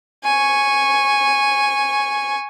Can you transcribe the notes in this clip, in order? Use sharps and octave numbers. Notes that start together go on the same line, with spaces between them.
G#5 C#6